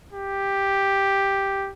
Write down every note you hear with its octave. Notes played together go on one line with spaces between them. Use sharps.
G4